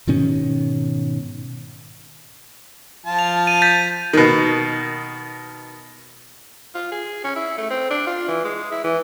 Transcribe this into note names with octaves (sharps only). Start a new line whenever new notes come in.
G#2 B2 D#3 C#4
F3 F4 A5
F7
D#7
G6 A6 B6
B2 D#3
F4
G#4
C#4
E4
A3
C4
D4
F4
E3
G#3
E4
E3